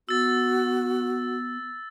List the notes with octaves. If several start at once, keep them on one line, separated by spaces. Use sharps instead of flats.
B3 F#4 E6 A6